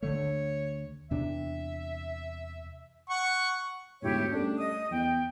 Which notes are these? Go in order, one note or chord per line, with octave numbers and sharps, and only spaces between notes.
D2 D3 A3 C#5
E2 C3 D4 E5
F#5 C#6
D2 G#2 B2 E4 G4 C#5
G3 A3 C#4 D4
D#5 D#6
E2 G5